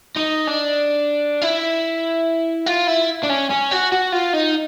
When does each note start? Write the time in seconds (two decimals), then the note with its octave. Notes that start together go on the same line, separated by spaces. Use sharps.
0.16 D#4
0.47 D4
1.41 E4
2.66 F4
2.87 E4
3.24 D4
3.30 C#4
3.50 C#4
3.71 F#4
3.92 F#4
4.12 F4
4.33 D#4